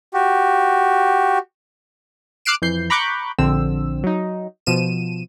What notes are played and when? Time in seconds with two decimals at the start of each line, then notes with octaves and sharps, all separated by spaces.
0.14 F#4 G4
2.45 D6 F6 F#6 C7 D7 E7
2.62 F2 E3 G6 C7
2.90 A#5 B5 C#6 D6 F#6 G6
3.38 A#1 D3 C4 E6
4.04 F#3 D#4
4.66 B2 F3 D#7 E7